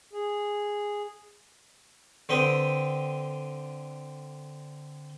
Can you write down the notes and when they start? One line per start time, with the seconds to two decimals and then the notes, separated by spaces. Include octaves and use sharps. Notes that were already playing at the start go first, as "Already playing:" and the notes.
0.13 G#4
2.29 D3 C4 B4 G5 B5 D#6